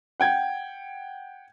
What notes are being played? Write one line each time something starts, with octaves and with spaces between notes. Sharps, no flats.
F#5 G5 G#6